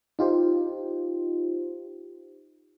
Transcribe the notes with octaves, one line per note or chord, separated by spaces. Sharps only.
D#4 F4 G4 C5